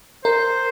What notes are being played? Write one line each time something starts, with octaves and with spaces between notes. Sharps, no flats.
A#4 C5